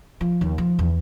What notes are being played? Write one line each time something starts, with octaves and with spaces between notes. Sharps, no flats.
F3
D#2
F3
E2